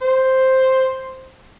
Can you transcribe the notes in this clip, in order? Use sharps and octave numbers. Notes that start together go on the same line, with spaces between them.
C5